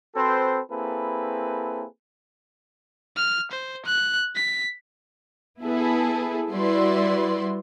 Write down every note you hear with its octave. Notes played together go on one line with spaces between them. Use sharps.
C4 F#4 A4 B4 C5
A#3 C4 E4 G#4 A4 B4
F6
C5
F#6
B6
B3 E4 G#4 A4 B4
G3 E4 F#4 B4 D5 C6